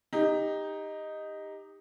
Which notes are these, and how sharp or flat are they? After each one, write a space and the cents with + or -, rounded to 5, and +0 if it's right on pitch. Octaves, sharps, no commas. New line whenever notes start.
D#4 +0 G4 +25